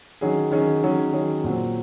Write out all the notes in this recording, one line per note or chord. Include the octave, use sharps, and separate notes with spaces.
D#3 F#3 C#4 G#4
D#3 F#3 C#4 G#4
D#3 F#3 C#4 G#4
D#3 F#3 C#4 G#4
A#2 F#3 C4